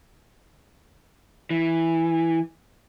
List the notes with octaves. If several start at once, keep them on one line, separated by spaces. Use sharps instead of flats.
E3